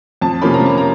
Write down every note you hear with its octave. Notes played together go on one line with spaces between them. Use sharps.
F2 A5
C3 F3 A#3 C#4 B5
A#5
F2 A5
A#5